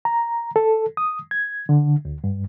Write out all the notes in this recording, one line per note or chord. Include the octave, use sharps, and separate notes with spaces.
A#5
A4
D#6
G#6
D3
D2
G2